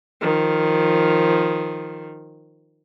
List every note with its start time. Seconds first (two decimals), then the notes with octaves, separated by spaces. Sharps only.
0.21 D#3 F3